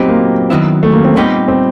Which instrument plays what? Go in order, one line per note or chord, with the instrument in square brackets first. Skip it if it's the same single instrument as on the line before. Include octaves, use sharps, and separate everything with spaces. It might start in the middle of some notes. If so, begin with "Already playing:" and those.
Already playing: [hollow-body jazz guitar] A#2 F#3 B3 D#4 G4 [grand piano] C4
[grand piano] A#3
[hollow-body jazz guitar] F#2 D#3 F#3 B3 E4
[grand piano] A3
A#3
C4
[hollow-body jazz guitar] A#2 G3 B3 D#4 G4 [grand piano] C4
[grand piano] C4